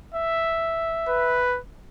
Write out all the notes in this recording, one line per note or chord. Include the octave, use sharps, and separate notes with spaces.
E5
B4